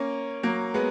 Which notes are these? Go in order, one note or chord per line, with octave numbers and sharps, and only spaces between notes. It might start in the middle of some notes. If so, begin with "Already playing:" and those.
Already playing: A#3 C#4
F#3 A#3
G#3 B3